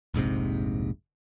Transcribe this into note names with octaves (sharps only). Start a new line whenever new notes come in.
F1 A#1 G#2 C3